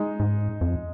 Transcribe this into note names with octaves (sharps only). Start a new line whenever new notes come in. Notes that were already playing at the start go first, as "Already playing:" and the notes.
Already playing: G#3 D#4
G#2
F2